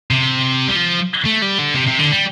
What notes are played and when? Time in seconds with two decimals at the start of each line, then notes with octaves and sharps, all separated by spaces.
0.10 C3
0.68 G3
0.76 F3
1.26 A3
1.42 G3
1.59 D3
1.75 C3
1.87 C3
1.99 D3
2.12 G3